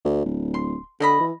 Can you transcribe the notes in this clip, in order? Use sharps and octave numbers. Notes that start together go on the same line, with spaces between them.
D2
D1
C6
B2 D3 D#5 B5
E3